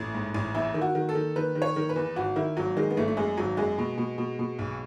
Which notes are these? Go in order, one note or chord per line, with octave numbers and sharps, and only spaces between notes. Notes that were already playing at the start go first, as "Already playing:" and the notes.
Already playing: A1 A3
G#2
A1
E2 E4
D#3
F#4
D#3
A4
D#3
D#3 B4
D#3
C#5
D#3
B4
E2
G#1 F#4
D#3 E4
G#1 F#3
D#3 G#3
B3
G#1 A3
A3
F#2 G#3
G#1 F#3
F#2 G#3
B2
B2
B2
B2
B1